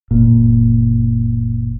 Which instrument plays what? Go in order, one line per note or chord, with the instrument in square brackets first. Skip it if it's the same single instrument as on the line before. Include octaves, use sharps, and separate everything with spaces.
[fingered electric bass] F#1 A#2